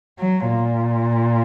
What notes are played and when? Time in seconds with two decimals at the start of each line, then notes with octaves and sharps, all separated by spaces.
0.20 F#3
0.49 A#2